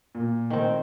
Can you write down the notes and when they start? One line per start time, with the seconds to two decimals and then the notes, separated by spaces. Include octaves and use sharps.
0.15 A#2
0.50 D#3 C4